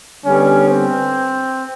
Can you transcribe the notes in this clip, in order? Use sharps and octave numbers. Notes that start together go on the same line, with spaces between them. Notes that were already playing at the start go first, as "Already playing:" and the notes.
D3 G3 B3 C#4
C4